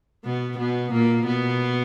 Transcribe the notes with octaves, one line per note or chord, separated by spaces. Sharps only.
B2 B3
B2 B3
A#2 A#3
B2 B3